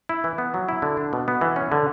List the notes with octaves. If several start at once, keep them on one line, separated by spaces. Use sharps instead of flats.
E4
E3
B3
F#3
E4
D3
D4
B2
B3
E3
C#4
D3